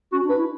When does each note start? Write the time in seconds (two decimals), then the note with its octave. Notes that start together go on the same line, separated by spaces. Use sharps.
0.12 C#4 F#4
0.24 D4
0.29 B4
0.37 E4